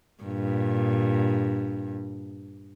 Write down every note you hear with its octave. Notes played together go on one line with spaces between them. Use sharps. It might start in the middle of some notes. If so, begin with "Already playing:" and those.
G2 A#2